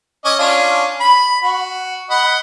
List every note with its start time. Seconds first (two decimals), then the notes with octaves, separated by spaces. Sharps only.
0.25 C#4 D#5 D6
0.39 C#4 D4 F4
1.00 B5
1.43 F#4
2.10 D#5 F#5 B5